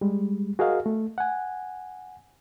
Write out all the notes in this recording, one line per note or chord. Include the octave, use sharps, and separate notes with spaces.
G3 G#3
F#4 G#4 A#4 D#5 F5
A3
F#5 G#5